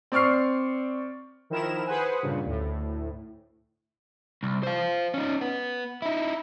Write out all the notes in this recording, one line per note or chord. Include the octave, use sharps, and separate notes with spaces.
C4 D5 C#6 F6 C7
D#3 F3 E4 A#4 E7
G#4 B4 C5 F#5 G#5
G2 A#2 C#3
D2 A2
C2
C5 F5
C#4 D#4
B3
D#4 E4